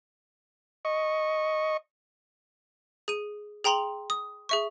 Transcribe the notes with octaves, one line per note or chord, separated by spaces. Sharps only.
D#5 C#6
G#4 D#7
G#4 G5 A#5 C6 F7 F#7
D#6
G#4 E5 C#6